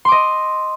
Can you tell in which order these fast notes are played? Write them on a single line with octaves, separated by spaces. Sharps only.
C6 D6 D#5